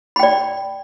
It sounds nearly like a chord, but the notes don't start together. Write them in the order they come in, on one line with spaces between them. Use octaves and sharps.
B5 G5 D5